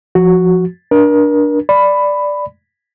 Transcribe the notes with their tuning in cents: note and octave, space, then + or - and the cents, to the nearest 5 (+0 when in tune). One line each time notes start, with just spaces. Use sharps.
F3 +0 F#4 +0
D4 +0 A#4 +35
D5 +0 B5 +10